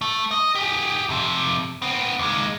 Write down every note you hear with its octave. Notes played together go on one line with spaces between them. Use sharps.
A3 A4
D#5
G4 G#4
F2 C3
B3 C4
D#2 G#3